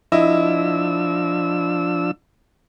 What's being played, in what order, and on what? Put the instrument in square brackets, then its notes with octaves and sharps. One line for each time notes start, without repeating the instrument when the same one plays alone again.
[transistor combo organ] F3 D4 E6 [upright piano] E4 D#5